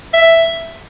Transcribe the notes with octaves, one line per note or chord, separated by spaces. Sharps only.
E5